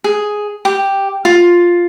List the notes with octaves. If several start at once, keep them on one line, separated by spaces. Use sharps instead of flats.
G#4
G4
F4